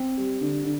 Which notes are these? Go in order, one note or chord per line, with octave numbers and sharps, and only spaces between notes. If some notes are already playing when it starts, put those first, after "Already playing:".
Already playing: C4
G3
D3
D3